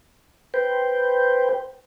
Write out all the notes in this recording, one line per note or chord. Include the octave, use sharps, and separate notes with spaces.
B4 C5 G5